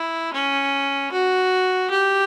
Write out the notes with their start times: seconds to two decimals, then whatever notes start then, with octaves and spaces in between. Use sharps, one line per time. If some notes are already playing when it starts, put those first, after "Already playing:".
Already playing: E4
0.33 C#4
1.12 F#4
1.91 G4